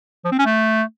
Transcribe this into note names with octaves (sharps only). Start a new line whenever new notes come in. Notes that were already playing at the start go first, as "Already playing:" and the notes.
F3
C4
C#4
A3